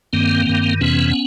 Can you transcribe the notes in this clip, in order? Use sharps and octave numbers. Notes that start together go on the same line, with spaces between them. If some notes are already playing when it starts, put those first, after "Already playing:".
G2 D#3 A#3 C4
G2 D#3
F2 C3 E3 B3 C#4